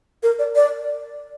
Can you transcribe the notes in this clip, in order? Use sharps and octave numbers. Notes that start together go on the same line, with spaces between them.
A#4
D5
D5